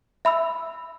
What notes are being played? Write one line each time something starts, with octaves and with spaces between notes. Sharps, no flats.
E5 B5 E6